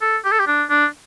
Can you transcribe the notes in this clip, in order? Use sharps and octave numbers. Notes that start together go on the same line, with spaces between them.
A4
G4
A4
G4
D4
D4